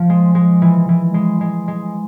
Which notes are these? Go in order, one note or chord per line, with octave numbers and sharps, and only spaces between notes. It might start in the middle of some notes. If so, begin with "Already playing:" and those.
Already playing: F3
G#3
G#3
E3
E3
G#3
G#3
G#3